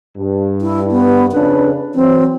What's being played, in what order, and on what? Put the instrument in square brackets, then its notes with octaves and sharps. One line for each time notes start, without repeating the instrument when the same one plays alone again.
[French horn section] G2
[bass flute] E4
B3
[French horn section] F2 C#3 D4 [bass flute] B4
[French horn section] E3 F#3 [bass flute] C4